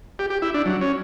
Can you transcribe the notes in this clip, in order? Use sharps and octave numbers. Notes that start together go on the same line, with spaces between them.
G4
G4
E4
D4
F#3
C#4